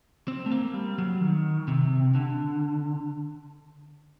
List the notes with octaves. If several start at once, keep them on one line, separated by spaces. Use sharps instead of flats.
C4
A3
A#3
G3
F#3
D#3
C3
D3